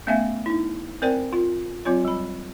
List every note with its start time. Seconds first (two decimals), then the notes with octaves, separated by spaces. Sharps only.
0.07 A3 B3 C#4 E5 F5 G#5
0.46 D#4 E4
1.02 C4 A#4 C5 D5 G5
1.33 F4
1.85 F#3 C4 F4 C#5
2.05 G3 B5